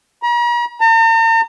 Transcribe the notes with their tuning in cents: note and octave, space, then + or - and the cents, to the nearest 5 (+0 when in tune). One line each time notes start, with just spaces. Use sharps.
A#5 +45
A#5 -45